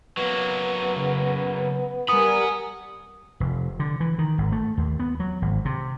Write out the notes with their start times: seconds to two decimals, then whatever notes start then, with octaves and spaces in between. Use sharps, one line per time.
0.17 F#3 A#3 B3
0.96 C#3
2.08 G3 A#4 F#5 G#5 B5 D#6
3.40 F1
3.80 D3
4.00 E3
4.18 D#3
4.38 G#1
4.52 A3
4.77 D#2
4.99 B3
5.20 F#3
5.42 G#1
5.65 C3